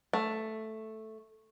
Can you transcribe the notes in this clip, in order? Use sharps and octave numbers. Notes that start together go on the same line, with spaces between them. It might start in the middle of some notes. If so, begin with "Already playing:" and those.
A3